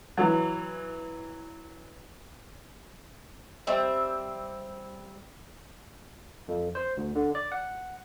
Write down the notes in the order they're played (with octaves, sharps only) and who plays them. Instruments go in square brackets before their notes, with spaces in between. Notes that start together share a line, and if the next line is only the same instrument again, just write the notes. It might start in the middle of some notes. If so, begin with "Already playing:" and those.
[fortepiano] E3 F#3
[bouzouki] G3 C4 E5
[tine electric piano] F2
C5
D2
D3
D5
F#5